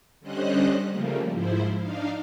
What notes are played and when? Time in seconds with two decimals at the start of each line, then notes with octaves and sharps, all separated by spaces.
0.20 D3 G3 C#4 C5 D#5 F#6
0.90 C#3 F3 G3 A3 A#3
1.32 G#2 F3 E4 C5
1.78 D4 D#4 F5